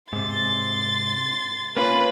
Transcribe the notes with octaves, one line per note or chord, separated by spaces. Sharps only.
G#2 C3 C6 A6
A#3 C#4 F4 B4